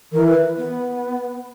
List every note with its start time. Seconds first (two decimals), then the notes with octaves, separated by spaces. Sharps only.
0.12 E3 A#4
0.28 B4
0.57 B3